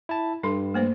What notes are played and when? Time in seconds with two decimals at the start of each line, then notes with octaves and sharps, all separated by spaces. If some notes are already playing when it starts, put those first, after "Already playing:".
0.09 E4 A5
0.43 G2 D4 A4 C6
0.74 A3 A#3 C5